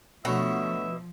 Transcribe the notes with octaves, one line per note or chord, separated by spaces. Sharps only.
B2 D3 F3 F#3 A3 E5